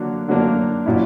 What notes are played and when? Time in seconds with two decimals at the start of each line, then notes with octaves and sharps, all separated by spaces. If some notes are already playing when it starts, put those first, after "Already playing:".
Already playing: D3 F#3 A#3 D4
0.28 D3 F#3 A#3 D4
0.86 A#2 F#3 C#4 E4